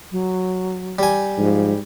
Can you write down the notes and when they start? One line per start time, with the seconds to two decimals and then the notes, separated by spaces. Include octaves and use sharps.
0.11 F#3
0.99 G3 G#5
1.38 G#2 F3